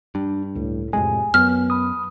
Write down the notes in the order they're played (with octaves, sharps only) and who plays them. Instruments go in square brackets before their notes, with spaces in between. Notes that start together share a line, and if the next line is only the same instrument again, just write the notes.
[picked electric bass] G2 [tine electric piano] D4
[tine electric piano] C#2 [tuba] A2
[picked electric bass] F2 A2 G#3 [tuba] C3 [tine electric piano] G#5
[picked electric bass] F#2 [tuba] B3 [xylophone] F6
[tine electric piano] B5 D#6